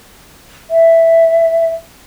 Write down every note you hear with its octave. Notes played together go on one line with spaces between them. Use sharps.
E5